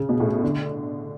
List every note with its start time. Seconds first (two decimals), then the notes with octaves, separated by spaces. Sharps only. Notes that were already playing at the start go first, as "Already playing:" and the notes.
Already playing: C#3
0.09 B2
0.20 A2
0.43 D3